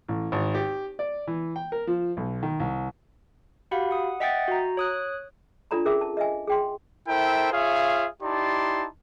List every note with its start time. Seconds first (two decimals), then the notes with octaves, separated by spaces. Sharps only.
0.08 A1
0.32 G#1
0.55 G4
0.99 D5
1.27 E3
1.56 G5
1.72 A#4
1.87 F3
2.17 B1
2.43 D#3
2.60 C2
3.71 F#4 G4 F5 F#5 B5
3.91 F#5 D#6
4.20 D#5 E5 F#5 G5 D#6 A6
4.48 F#4 A#5
4.77 C#5 D#6 F#6
5.71 D4 F4 A4 D5 A#5 B5
5.85 C#4 G#4 A#4 E5 D6
6.01 A5
6.17 D#5 E5 G#5
6.47 G#4 G5 C6
7.08 E4 A4 A#4 C5 E5 G5
7.52 F4 G#4 C#5 E5 F5
8.22 D#4 E4 G4 D5 A5 C6